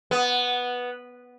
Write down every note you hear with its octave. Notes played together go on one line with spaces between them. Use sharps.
B3